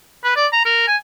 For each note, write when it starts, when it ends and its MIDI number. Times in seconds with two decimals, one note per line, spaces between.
0.24 0.32 71
0.36 0.47 74
0.52 0.62 82
0.65 0.83 70
0.87 0.96 80